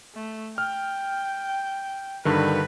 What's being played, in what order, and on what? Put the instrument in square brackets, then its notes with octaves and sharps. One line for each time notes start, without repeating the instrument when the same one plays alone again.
[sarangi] A3
[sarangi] G5 [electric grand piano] F6
[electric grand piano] G2 D3 D#3 [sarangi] B4